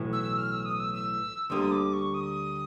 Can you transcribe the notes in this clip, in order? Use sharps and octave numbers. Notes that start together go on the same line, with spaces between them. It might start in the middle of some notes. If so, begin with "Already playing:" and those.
Already playing: B1 A2 E3
E6
E6
F6
E6
D#6
E6
E6
D2 D3 G3 A#3 D#6
D6
C#6
D#6